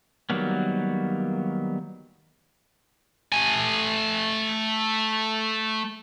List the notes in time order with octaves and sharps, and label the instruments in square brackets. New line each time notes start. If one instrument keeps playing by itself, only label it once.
[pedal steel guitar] D#3 F#3 G3 A#3 B3
[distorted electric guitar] A3 G#5